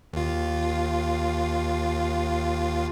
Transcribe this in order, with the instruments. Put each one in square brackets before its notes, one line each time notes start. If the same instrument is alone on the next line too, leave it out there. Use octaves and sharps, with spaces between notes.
[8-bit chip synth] D#2 F4